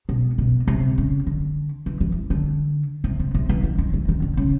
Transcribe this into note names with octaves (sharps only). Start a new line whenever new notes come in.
B2
B2
C3
C#3
D3
E3
E3
D3
C3
C3
C3
E3
D#3
D#3
E3
D#3
D3
C#3